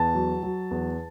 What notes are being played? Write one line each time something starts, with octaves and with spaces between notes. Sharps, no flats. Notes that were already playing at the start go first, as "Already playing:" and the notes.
Already playing: E2 A5
F#3
F#3
E2